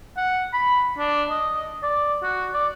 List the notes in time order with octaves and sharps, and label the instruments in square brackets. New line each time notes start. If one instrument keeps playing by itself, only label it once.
[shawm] F#5
B5
D4
D#5
D5
F#4
D5